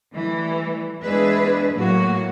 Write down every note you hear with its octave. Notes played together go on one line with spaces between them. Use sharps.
E3 G3 A3
E2 G#3 D4 G#4 B4 E5
A2 F#3 A3 A#3 F#4